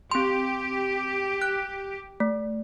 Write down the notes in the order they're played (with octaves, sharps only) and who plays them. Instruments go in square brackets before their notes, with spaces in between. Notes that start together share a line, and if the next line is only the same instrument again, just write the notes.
[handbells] C4 C6 [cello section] G4
[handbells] F#6
A3